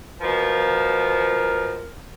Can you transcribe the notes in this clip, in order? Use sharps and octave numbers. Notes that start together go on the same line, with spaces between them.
B2 F3 A#4